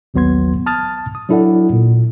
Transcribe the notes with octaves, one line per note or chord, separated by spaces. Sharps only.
A1 D#2 F#3 B3 C6 G#6
A5 D#6 F6 G#6 A6
D#6
F#3 D4 E4 A4 D5 F#5
A#2